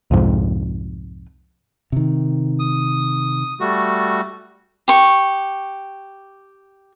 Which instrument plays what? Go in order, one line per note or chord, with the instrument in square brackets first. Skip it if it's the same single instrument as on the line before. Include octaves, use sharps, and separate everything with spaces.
[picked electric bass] C2 F2 G#2
[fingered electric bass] C3 D#3
[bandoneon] D#6
G3 A3 F#4
[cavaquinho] G4 C#6